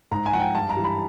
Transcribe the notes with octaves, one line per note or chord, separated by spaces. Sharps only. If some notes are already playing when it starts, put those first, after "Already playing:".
G#2 A#5
G#5
F3 F#5
G5
G2 A5
A#5
E3 G3
B5